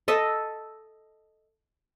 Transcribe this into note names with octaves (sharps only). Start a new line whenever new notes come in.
A4 D#5 E5